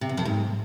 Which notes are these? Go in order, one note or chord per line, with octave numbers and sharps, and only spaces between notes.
C3
E2
F2
G#2